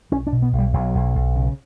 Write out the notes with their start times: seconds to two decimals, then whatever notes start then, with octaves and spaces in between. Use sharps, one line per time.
0.12 B1 C#4
0.27 D4
0.32 B2
0.42 B3
0.53 B1
0.58 G3
0.73 B1 F#3
0.95 B1
1.15 B1
1.35 C#3